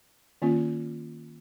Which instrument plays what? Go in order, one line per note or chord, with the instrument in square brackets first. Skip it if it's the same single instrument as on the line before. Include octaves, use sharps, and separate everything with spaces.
[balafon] D#3 A#3 C#4 F4